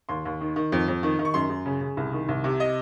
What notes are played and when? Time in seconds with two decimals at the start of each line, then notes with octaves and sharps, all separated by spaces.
0.09 D#2 C6
0.25 D#2
0.41 D#3
0.56 D#3
0.72 F2
0.88 F2
1.03 D#3
1.19 D#3
1.25 C#6
1.34 F#2 C6
1.50 F#2
1.66 C#3
1.81 C#3
1.97 C2
2.12 D#3
2.29 C2
2.44 C3
2.60 D#5